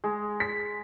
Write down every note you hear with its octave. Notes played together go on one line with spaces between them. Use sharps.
G#3
B6